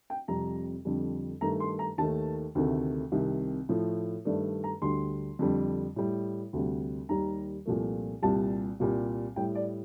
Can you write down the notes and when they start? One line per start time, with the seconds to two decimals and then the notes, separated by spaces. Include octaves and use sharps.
0.10 G5
0.28 F2 C3 G3 A#5
0.85 F2 D3 G3
1.41 G2 D#3 A3 A#5
1.60 C6
1.79 A#5
1.98 D#2 D#3 A3 A5
2.55 D2 C3 D#3 A3
3.12 C2 C3 D#3
3.69 A2 F3 A3
4.25 G2 D#3 A3 D5
4.64 A#5
4.82 D2 D3 G3 C6
5.39 F2 D3 G3
5.96 A2 G3
6.53 D2 C3 G3
7.09 D#2 D#3 G3 A#5
7.66 C2 A#2 F3 A3
8.22 C2 A#2 G3 A5
8.80 C2 A#2 G3
9.36 A2 G3 G5
9.55 D5